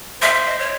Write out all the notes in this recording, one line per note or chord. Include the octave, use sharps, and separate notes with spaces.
C5 E5
E5
D#5
C#5